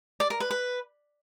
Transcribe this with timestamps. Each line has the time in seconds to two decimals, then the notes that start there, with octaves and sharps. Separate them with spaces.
0.20 D5
0.30 A#4
0.40 B4
0.51 B4